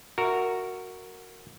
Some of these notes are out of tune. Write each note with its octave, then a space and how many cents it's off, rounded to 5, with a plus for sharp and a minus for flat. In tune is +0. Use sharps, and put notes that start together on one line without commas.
F#4 +0 A#4 -15 E5 +0